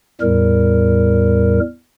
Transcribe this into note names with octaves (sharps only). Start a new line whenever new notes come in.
E2 A2 G3 A#4